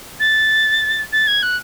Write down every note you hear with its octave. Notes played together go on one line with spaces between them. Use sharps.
A6
A6
G#6
F#6